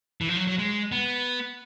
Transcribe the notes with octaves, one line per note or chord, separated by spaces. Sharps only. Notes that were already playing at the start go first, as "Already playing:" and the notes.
E3
F3
F#3
F#3
G#3
B3